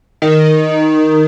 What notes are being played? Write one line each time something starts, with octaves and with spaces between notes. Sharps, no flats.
D#3